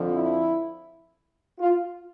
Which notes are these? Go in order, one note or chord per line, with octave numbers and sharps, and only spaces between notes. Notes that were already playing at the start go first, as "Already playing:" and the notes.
Already playing: F2 D3 F3
E4
F4